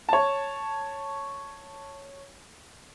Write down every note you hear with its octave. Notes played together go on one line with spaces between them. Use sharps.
C#5 A5